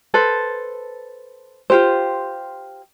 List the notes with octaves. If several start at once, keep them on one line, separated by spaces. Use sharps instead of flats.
A4 B4 C5
F4 G4 C5